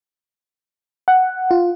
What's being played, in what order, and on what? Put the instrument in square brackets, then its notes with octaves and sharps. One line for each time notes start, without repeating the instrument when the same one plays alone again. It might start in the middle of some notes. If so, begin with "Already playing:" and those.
[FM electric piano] F#5
F4